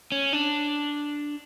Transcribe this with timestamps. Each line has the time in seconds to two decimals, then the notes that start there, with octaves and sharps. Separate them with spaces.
0.12 C#4
0.33 D4